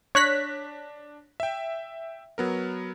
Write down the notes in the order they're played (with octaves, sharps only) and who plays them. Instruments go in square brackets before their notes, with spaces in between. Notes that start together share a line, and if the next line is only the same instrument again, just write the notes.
[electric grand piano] D4 A#6 [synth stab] C#5 F#6 B6
[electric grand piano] E5 G5
F#3 B3 A#4